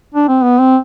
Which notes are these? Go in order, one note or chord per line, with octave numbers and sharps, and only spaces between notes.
D4
C4
B3
C4